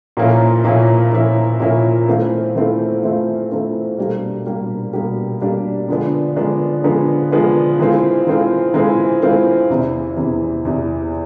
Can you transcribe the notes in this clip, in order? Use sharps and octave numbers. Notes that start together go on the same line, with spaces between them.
A#2 F3 A#3 C#4 E4
A#2 F3 A#3 C#4 E4
A#2 F3 A#3 C#4 E4
A#2 F3 A#3 C#4 E4
E3 A3 C4 F4
E3 A3 C4 F4
E3 A3 C4 F4
E3 A3 C4 F4
B2 G3 A#3 D4 G4
B2 G3 A#3 D4 G4
B2 G3 A#3 D4 G4
B2 G3 A#3 D4 G4
D3 F3 G#3 B3 D4
D3 F3 G#3 B3 D4
D3 F3 G#3 B3 D4
D3 F3 G#3 B3 D4
E3 G#3 C4 F4
E3 G#3 C4 F4
E3 G#3 C4 F4
E3 G#3 C4 F4
E2 C3 E3
E2 C3 E3
E2 C3 E3